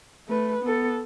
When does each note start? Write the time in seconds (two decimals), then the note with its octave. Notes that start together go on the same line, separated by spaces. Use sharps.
0.28 A3 B4
0.63 B3 A4